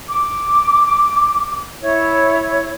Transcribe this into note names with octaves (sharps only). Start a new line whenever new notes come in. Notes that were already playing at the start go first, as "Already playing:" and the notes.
D6
E4 C#5